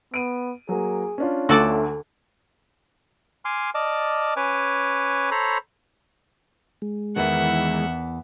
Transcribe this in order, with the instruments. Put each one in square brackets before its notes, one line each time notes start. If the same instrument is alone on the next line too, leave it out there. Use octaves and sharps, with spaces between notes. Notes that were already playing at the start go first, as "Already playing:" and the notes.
[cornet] B3 [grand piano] D7 D#7
[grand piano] F#3 A#3 [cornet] G#4
[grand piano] C#4 D4 F4
[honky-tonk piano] D2 [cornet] A3 [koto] F#4 A4 D5
[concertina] G#5 C6 D6 F6
D5 D#5 A5 D6 F6
C#4 B4 C#5 G#5 D6
A4 C5 C#5 A#5 B5
[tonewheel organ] G#3
[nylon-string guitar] E2 A#4 [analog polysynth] D#3 E3 [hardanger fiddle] E5 F#5